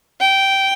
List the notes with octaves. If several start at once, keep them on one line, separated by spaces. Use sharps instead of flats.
G5